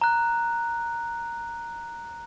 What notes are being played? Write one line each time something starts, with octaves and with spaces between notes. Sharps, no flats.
A#5 F#6